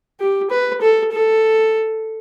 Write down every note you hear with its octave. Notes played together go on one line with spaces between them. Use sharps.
G4
B4
A4
A4